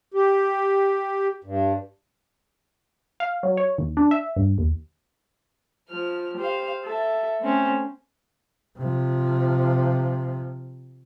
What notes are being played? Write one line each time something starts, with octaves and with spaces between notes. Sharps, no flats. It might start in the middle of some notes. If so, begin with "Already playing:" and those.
G4
G2
F5
F#3
C#5
D#2
D4
E5
G2
D#2
F3 F6
G4 C5 F5
A4 E5
A3 C4 C#4
C3 F3